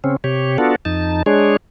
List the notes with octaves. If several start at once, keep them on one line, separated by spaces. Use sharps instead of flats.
C#3 C4 C#4
C3 G4 C#5
B3 D4 F4 F#4 A4
F2 D#4 A5
G#3 D4 G#4 C#5